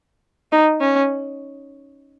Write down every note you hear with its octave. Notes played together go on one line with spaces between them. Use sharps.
D#4
C#4